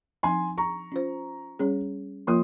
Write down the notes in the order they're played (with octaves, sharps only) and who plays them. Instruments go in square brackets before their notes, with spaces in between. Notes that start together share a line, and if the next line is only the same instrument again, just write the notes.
[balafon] F3 C4 D#4 [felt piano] G#5 C6
[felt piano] A#5 C#6
[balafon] C#4 F4 C5
G3 C#4 G#4 C#5
[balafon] F3 A#3 F4 A#4 C#5 [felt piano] C6 D#6